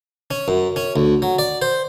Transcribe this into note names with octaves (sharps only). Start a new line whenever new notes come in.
C#4
F#2
C#4
D2
F#3
D5
C5